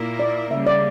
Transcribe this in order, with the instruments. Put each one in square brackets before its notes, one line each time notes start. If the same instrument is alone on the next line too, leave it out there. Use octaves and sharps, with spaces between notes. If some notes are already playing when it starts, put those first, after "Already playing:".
Already playing: [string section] A#2 A#3 E4 A#4
[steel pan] D5
[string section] C#3 G3 A#3 [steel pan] E5
[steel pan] D5